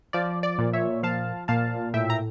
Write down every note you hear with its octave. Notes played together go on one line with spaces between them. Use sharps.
F3 D5
D5
A#2
C#5 E5
F3 F5 A5
A#2 F5 A5
A2 E5 G5
A#5